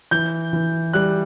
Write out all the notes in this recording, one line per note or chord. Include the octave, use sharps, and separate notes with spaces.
E3 G6
E3
G3 F#6